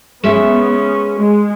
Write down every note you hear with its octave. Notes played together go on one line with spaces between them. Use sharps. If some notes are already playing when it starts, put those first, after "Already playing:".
G#3 B3 C#4 E5
G#3